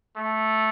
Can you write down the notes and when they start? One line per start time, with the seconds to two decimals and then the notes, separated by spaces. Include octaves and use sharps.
0.17 A3